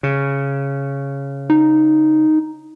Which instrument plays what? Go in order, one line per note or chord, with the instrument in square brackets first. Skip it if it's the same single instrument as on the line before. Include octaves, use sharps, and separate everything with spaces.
[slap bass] C#3
[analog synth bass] D#4